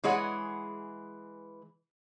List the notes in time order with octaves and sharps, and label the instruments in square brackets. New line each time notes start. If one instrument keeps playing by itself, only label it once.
[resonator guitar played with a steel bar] E3 G#3 G#4 C#5 F#5